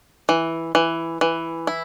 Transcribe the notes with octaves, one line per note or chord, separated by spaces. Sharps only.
E3
E3
E3
E4